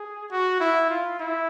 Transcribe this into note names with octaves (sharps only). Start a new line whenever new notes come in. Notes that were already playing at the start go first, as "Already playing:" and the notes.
Already playing: G#4
F#4
E4
F4
E4